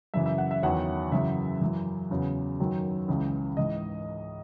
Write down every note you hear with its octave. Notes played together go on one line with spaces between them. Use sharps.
F#2 C#3 E3 E5
E5
F#5
E5
E2 D#3 F#3 F#5
F#2 C#3 E3 E5
F#2 E3
E2 C#3 F#3
F#2 D#3 F#3
C#2 C#3 E3
G#2 E3 D#5